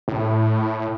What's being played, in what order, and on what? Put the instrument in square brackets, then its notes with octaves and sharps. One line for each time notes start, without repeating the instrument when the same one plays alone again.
[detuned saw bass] A2